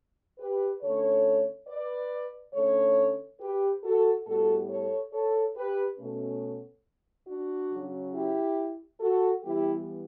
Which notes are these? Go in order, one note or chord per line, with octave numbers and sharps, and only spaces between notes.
G4 B4
D3 A3 C#4 A4 C#5
B4 D5
D3 A3 C#4 A4 C#5
G4 B4
F#4 A4
A2 G3 B3 F#4 A4
A4 C#5
A4 C#5
G4 B4
B2 A3 C#4
D4 F#4
C#3 F#3 C#4
E4 G4
F#4 A4
E3 G3 B3 E4 G4